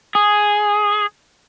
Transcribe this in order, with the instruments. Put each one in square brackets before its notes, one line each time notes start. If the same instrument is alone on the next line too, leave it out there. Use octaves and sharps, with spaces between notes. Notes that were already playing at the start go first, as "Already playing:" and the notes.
[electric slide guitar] G#4